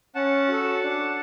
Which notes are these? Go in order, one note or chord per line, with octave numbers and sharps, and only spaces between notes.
C#4 F#5 A5
F#4 A4
D4